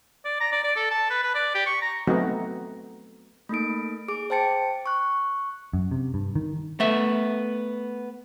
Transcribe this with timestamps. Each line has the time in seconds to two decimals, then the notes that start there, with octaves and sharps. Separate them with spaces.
0.25 D5
0.40 A#5
0.52 D5
0.64 D5
0.76 A4
0.91 A5
1.10 B4
1.23 B4
1.34 D5
1.55 G4
1.66 C#6
1.82 A#5
2.08 F#3 A3 B3 C4 D#4 F#4
3.49 A3 A#3 D#4 D7
4.08 G#4 D6 D7
4.30 C5 G5 A5 A6 C#7
4.86 C#6 F#6
5.73 F#2
5.91 C3
6.14 G2
6.35 D#3
6.80 A3 B3 E5